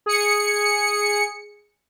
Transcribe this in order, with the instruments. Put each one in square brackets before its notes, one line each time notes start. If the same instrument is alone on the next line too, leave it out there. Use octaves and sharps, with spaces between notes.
[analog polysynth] G#4 C#7